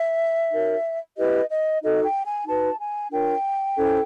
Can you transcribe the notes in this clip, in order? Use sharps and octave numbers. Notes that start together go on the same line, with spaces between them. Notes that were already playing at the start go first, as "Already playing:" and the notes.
Already playing: E5
D#4 F#4 A#4 C#5
E4 G4 B4 D#5
D#5
D#4 F#4 A4 D#5
G5
G#5
D#4 F#4 B4 A5
G#5
D4 F4 A#4 C#5 G5
C#4 E4 A4 C5